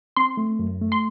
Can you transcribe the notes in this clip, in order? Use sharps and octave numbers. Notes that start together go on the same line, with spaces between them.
C4 C6
A3
F#2
A3
C6